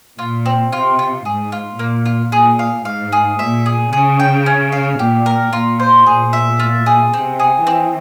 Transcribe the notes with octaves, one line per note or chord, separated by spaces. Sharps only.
A#2 F4
C4
C3 F4
F4
G#2 G#4
F4
A#2 A#3
F4
A#2 G#4
F5
G#2 F5
G#4
A#2 E5
G#4
C#3 G#4
G5
C#4
F5
A#2 G4
A#4
A#2 F4
C5
A#2 G#4
E5
F4
G#4
C3 C4
G#4
E3 C4